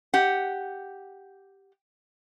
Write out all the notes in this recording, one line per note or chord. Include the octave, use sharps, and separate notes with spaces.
G4 F#5